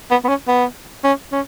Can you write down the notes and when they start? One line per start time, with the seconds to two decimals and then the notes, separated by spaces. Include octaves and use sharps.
0.11 B3
0.25 B3
0.29 C#4
0.48 B3
1.04 C#4
1.32 C#4